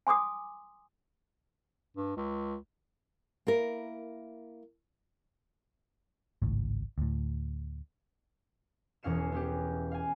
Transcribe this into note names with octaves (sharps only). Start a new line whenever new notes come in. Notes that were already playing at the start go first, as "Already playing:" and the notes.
G#5 C6 D6 D#6
G2
C#2
A#3 E4 A#4
G#1 C#2 A2
D2 A2
E1 E2 C#4 F5 C#7 E7
B3 C#4 G4
F5 G#5